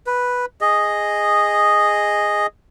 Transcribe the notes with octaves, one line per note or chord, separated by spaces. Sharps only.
B4
G#4 D#5